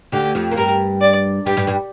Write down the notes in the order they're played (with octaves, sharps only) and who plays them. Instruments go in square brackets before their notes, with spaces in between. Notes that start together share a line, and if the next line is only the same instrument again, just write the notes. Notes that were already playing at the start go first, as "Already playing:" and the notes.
[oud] D2 D3 [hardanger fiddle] G4
[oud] F2 F3
A#3
[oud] G2 G3 [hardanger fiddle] A#4
[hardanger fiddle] D5
[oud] G2 G3 [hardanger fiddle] G4
[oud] G2 G3
G2 G3